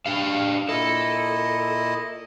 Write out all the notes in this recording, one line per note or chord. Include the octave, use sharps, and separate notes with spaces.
D4 G4 F5
A#2 E4 A4 D#5